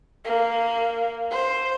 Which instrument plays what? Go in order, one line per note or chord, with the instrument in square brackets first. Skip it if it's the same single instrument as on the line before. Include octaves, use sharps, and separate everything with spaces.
[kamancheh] A#3
C5